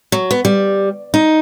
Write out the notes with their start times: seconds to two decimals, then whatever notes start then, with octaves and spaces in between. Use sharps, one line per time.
0.12 F#3
0.31 B3
0.45 G3
1.14 D#4